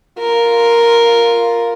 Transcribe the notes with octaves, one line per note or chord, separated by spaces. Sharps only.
F4 A#4